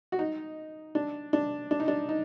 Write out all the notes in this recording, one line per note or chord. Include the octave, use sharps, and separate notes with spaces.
F#4
D#4
D4
D4
D4
D#4
D4
D#4